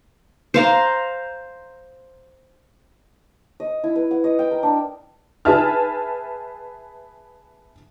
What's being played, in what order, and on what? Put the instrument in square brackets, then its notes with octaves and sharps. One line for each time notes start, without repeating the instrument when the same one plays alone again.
[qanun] C5 F5 A#5
[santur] D#5
E4
B4
F#5
D#5
G5
A#4
D4
[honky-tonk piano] G#4 B4 E5 A5 F6